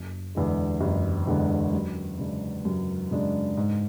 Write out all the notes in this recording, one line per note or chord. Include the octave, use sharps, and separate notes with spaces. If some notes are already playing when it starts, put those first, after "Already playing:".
Already playing: F#1
E2 D3 G#3
F#1
E2 D3 G#3
F#2
C#3 G#3 D4
F#2
C#3 G#3 D4
G#2